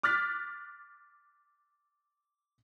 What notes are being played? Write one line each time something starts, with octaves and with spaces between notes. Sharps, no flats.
D6 F6 F#6 A6 B6